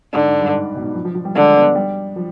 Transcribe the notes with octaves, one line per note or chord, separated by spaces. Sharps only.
G#2 D3
G#2
G2
G#2
B2
G#2
F3
F3
F3
G3
D3 G#3
B3
G3
F3